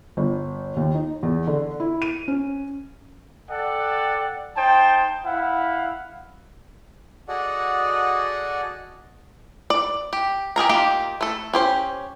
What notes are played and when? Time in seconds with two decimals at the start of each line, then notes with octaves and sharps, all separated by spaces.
0.17 G1
0.76 D#2
0.95 D#4
1.23 E2
1.47 D3
1.80 E4
2.02 D#7
2.28 C#4
3.50 A4 D5 F#5 G5
4.57 D#4 C5 G5 A5
5.25 E4 F5 F#5
7.28 F#4 G#4 A4 D5 D#5 F#5
9.70 D5
10.13 G4
10.56 G4 G#4 A#4 A#5
10.69 A#3 D#4 F4 G4
11.21 A3 A4
11.53 C#4 G4 C5